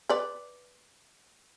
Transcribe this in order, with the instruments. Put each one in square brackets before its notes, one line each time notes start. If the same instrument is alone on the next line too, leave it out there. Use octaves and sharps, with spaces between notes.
[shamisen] B4 D5